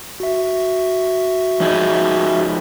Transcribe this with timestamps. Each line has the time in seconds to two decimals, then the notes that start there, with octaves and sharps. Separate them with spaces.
0.20 F#4 E5
1.60 F3 D#4 G#4